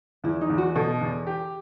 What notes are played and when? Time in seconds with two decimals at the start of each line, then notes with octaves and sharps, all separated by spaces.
0.24 E2 E4
0.41 D#4
0.50 E2
0.58 F#4
0.75 B2 A4
1.01 E2
1.27 G4